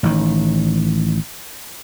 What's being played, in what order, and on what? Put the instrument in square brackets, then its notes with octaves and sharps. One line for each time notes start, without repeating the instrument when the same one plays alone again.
[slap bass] A1 D#3